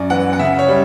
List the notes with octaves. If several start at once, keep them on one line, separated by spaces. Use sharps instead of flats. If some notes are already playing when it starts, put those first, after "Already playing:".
Already playing: F#2 D5
E3 F#5
F#5
C#3 E5
C#5
G3